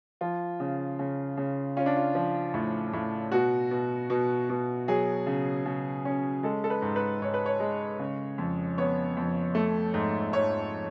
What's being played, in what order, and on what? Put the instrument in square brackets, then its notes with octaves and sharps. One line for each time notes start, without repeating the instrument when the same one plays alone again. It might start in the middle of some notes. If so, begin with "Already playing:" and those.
[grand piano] F3 F4
C#3
C#3
C#3
C#4 F4
D4
F4
F3
A2
A2
B2 F#4
B2
B2
B2
F#3 G#4
C#3
C#3
C#4
G#3 A4
A4
B4
G#2
B4
G#2 C#5
B4
C#5
G#3
C#3
F2
B3 C#5
F2
A3
G#2
G#2 C#5